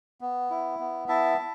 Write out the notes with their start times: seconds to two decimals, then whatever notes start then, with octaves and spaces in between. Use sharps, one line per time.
0.21 B3
0.50 E4
0.79 B3
1.08 E4 E5 A5
1.38 E4